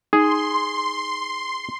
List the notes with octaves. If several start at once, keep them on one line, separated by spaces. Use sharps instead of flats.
D#4 G#4 C6